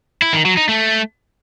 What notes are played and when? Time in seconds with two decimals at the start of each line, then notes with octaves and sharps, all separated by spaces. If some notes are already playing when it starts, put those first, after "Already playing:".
0.22 E4
0.34 D#3
0.45 F#3
0.57 D#4
0.69 A3